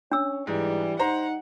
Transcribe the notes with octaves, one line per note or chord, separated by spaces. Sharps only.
C#4 D4 C#5 E6
G#2 E3 G3
D#4 C5 F#5 A#5